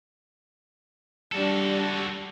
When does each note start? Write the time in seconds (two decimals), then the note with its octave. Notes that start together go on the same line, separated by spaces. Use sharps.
1.32 G3 D4 F#4 A4